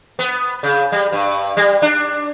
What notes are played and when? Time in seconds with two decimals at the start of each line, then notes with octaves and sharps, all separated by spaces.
0.19 B3
0.63 C#3
0.92 G3
1.12 G2
1.57 G3
1.82 D4